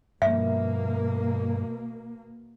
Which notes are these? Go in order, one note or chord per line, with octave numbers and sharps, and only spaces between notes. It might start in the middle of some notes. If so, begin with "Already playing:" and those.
G2 B2 F3 A#3 E5